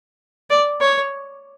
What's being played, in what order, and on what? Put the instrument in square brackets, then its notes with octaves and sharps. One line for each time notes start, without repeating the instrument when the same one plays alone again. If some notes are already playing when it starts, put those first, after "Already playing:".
[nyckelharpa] D5
C#5